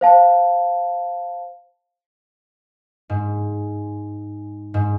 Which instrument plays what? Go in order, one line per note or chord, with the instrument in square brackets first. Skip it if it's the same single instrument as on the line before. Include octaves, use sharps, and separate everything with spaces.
[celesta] C5 F5 A5
[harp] G#2
G#2